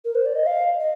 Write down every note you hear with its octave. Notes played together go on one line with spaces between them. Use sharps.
A#4
C5
D5
D#5
F5
D#5